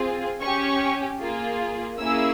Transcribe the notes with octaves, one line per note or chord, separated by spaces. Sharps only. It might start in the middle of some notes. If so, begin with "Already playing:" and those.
Already playing: C4 F4 G#4
C#4 G4 C#6
A#3 F4 G#4
A#3 C#4 E4 G#4 E6